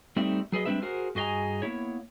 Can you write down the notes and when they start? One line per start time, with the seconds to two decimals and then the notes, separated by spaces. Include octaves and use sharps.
0.16 G3 A3 C4 D#4 D5 E5
0.52 F#3 G#4 B4 D#5
0.66 G3 G#3 C4 D4 B4 E5
0.82 F#4 G#4 A#4 C5
1.15 G2 F#4 G#4 D#5 G#5 A#5
1.62 A#3 B3 E4 C#5